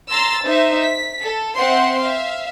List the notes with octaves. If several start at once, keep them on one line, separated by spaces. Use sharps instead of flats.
A#5 C6 E6 A6
D#4 C5 E5
B6
A4
C4 C5 E5 F#5 C6
E5 F5